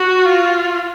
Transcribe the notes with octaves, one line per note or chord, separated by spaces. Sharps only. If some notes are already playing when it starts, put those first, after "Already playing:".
Already playing: F#4
F4